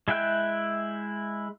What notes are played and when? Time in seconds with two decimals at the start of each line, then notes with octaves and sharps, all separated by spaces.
0.08 G#3 E4 E5 G5 F#6